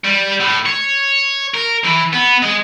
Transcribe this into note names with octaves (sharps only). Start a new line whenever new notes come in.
G3
A2
C#5
A#4
E3
B3
G#3